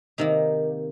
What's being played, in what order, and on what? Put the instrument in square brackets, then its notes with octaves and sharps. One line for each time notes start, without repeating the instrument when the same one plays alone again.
[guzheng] C3 D#3 A#3 D#4